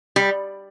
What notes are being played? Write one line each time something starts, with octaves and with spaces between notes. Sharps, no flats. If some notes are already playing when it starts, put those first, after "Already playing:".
G3